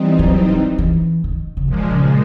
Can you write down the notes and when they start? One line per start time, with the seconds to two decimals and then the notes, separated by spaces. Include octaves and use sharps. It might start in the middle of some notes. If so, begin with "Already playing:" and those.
Already playing: E3 G3 C4 D#4
0.19 F#3
0.49 F3
0.79 E3
1.24 D#3
1.57 C#3
1.68 A#2 D3 F3 G#3
1.90 C#3